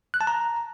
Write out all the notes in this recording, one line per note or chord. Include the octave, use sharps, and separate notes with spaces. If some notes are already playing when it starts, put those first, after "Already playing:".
F#6
A5
A#5